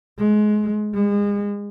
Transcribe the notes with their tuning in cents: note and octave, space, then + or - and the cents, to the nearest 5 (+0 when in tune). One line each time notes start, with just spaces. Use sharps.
G#3 +25
G#3 -35